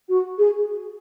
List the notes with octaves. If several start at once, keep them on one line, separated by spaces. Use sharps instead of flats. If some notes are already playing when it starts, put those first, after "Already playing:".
F#4
G#4